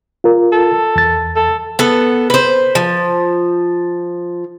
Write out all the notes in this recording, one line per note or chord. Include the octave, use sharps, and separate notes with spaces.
F4 A#4
A4
E2 A6
A4
B3 A4
B4 C5
F3